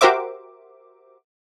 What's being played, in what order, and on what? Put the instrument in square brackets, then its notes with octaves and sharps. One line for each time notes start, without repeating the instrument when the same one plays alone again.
[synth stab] F#4 G4 A#4 C5 E5 D6